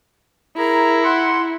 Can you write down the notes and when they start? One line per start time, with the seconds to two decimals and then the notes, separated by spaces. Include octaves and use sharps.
0.57 E4 G#4 A#4 A#5
1.03 F#5 C6